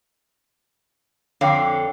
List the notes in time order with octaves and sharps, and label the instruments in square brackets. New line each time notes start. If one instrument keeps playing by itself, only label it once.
[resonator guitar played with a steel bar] F2 D3 F5 [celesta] C#5 G5 D6